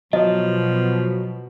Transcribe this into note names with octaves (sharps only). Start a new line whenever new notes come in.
B2 F3 F#3 D#5